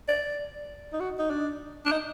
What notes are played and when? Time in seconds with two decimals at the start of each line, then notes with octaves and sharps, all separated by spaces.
0.08 D5
0.93 D#4
1.00 F#4
1.19 D#4
1.30 D4
1.86 D4
1.92 D#4